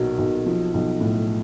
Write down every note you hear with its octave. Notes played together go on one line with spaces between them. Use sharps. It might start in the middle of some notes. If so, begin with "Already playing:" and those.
Already playing: B1 A#2 F#3
B1
F3
B1
A2